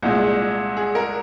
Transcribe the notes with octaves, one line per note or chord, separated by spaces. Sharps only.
C2 A#2 G#3
G#4
A#4